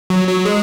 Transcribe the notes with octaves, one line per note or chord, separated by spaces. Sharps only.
F#3
F#3
G#3